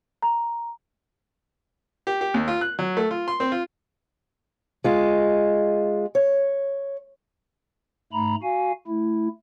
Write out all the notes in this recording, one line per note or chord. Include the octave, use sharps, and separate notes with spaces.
A#5
G4
G4
D#2
F4
F#6
F#3
A3
F4
C6
C4
F4
G#3 F4
C#5
G#2 A3 A#5 B5
F#4 F5 G#5
A3 E4